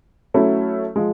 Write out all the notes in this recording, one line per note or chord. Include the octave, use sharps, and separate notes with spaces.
F#3 A3 C#4 E4
F3 G#3